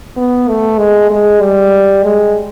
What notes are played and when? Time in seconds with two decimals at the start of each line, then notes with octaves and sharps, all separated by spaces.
0.17 B3
0.48 A3
0.78 G#3
1.11 G#3
1.41 G3
2.03 G#3